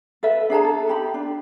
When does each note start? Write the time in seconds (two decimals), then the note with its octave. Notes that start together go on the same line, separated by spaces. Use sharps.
0.23 A4 B4 E5
0.50 D4 G#4 A5 A#5
0.64 A4
0.88 D#4 G4 B5
1.14 D4